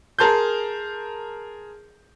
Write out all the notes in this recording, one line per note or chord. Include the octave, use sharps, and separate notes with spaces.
G#4 A#4 A5 C6 G6